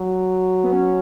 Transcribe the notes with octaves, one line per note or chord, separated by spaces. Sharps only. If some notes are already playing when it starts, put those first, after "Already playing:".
Already playing: F#3
B3
C#4